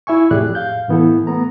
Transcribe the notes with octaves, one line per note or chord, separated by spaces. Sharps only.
E4 E5 G#5 C#6
F2 A2 G4 G#4 D5 F#6
F5 G6
A2 E3 B3 E4 A4
A3 B3 A#5